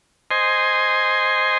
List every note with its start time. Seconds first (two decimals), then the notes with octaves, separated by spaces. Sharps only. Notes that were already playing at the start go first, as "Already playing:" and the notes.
0.31 C5 D#5 G#5 C6